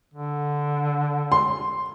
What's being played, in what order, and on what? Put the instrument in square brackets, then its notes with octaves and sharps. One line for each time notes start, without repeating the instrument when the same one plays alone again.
[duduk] D3
[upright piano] C6